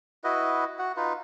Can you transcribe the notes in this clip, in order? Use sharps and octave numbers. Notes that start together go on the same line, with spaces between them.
E4 F#4 B4 D#5
F#4 F#5
D#4 F4 B4